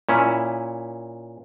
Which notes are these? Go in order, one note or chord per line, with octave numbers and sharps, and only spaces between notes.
A#2 C#4 E4